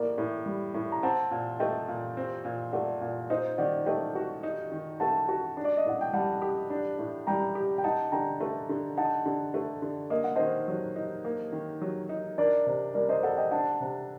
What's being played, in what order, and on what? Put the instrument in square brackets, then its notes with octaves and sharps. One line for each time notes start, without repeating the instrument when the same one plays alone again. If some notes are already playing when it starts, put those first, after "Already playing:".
Already playing: [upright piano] A2 A#3 [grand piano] A#4 D5
[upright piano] A2
G3
A2
[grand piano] A#5
[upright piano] C4 [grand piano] F#5 A5
[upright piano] A#2
[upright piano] A3 [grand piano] D#5 G5
[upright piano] A#2
C4
A#2
[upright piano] A3 [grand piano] D5 F#5
[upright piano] A#2
[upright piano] D#4 [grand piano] C5 D#5
[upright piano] D#3 [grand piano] D5 F#5
[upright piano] A3 [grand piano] D#5 G5
[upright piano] F#4
D#4
D#3
[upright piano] A3 [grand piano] F#5 A5
[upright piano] F#4
D4
[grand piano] D5
D#5
[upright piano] A2 [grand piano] F#5
[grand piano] G5
[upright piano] G3 [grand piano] F#5 A5
[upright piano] G4
D4
A2
[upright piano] G3 [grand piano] G5 A#5
[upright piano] G4
[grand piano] G5
[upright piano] D#4 [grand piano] F#5 A5
[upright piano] D3 [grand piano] G5 A#5
[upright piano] A3
D3
[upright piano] D#4 [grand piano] F#5 A5
[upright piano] D3
A3
D3
[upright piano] A#3 [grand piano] D#5
[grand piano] F#5
[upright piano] D#3 [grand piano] C5 D#5
[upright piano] F#3
D#4
A#3
D#3
F#3
D#4
[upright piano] D4 [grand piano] A#4 D5
[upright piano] C3
[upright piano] G3 [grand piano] A#4 D5
[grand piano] C5 D#5
[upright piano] A4 [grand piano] D5 F#5
[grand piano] D#5 G5
[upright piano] D4 [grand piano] F#5 A5
[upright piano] C3